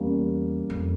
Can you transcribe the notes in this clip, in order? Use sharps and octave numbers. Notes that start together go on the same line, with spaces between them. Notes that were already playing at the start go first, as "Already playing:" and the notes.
Already playing: E2 G3 A#3 C#4
F2